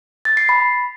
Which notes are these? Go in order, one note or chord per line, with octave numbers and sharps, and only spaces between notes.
A6
C7
B5